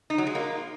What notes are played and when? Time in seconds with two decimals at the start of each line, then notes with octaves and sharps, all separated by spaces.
0.10 D#4
0.18 F#3
0.27 G#3
0.35 A#3